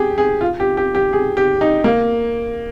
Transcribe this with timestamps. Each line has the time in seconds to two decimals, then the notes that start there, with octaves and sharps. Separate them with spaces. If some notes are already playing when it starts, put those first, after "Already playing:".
Already playing: G4 G#4
0.18 G#4
0.41 F4
0.60 G4
0.77 G4
0.95 G4
1.13 G#4
1.37 G4
1.61 D#4
1.84 A#3